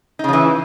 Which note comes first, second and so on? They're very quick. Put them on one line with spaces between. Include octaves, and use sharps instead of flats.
D#4 C#3 F3 E3